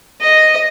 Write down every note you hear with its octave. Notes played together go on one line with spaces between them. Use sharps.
D#5